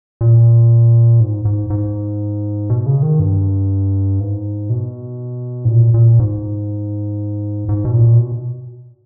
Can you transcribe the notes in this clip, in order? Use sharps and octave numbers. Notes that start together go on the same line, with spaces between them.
A#2
G#2
G#2
G#2
B2
C#3
D#3
G2
G#2
B2
G#2
A#2
A#2
G#2
G#2
B2
A#2
B2